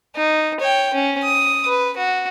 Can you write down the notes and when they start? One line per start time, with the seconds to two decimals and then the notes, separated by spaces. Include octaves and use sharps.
0.15 D#4
0.60 C#5 G5
0.94 C#4
1.23 D#6
1.67 B4
1.97 F#4